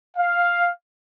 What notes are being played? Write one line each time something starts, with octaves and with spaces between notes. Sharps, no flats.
F5